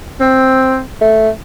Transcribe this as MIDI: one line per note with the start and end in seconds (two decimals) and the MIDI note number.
0.20 0.81 60
1.01 1.29 57